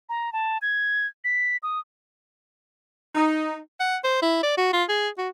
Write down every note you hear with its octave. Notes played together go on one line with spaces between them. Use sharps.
A#5
A5
G#6
B6
D#6
D#4
F#5
C5
E4
D5
F#4
F4
G#4
F#4